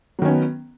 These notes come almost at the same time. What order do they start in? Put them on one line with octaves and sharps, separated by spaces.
F#3 D#3 C#4 B3